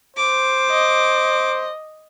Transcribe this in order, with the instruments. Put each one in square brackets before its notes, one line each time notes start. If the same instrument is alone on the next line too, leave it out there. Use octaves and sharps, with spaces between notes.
[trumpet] C5 [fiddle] D6
[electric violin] D#5